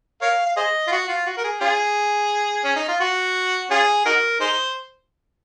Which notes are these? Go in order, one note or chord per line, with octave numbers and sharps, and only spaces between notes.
A#4 C#5 F5
F5
G#4 C5 D#5
F4
F#4
F4
F#4
A#4
G#4
C#4 F4 G#4
C#4
D#4
F4
F#4
C#4 F4 G#4
D#4 F#4 A#4
D#4 G#4 C5